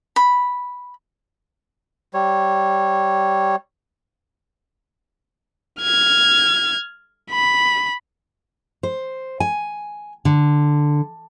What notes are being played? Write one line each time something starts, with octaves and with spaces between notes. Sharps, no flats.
B5
G3 C#5
F6 G#6
B5
C5
G#5
D3